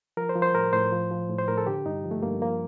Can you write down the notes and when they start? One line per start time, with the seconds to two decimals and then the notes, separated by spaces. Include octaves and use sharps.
0.17 F3 A#4
0.29 C5
0.36 F3
0.42 C5
0.55 A2 A#4
0.73 A2 C5
0.92 F3
1.11 F3
1.29 A2
1.39 C5
1.48 A2 A#4
1.58 A4
1.67 D3 G4
1.86 G2 D#4
2.04 F3
2.11 A3
2.23 G2 A#3
2.42 F3 A#3